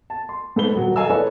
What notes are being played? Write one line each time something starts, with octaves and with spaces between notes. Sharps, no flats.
A5
C6
G#2 A4 B4 B5 G7
D#1 F#3
A4 D#5 F5 G#5 A#5 E6
E4 G#4 A4 B4 C#5 D5